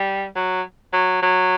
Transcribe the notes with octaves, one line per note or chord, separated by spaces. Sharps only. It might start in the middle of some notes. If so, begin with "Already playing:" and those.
Already playing: G3
F#3
F#3
F#3